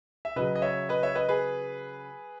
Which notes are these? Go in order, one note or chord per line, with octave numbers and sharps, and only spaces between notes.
E5
C#3 F#3 B4 D#5
D#5
C#5 E5
B4 D#5
C#5 E5
B4 D#5
G#4 B4